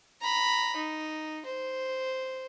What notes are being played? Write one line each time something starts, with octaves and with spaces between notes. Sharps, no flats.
A#5 B5
D#4
C5